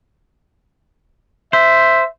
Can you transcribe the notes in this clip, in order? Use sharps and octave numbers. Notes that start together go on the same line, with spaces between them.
C5 E5